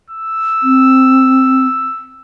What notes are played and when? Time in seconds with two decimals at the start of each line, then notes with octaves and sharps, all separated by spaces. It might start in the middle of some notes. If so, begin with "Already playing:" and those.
0.10 E6
0.63 C4